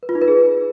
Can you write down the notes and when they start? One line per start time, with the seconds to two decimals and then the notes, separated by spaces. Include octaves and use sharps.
0.03 B4
0.09 F4
0.15 D#4
0.22 B4
0.28 G#4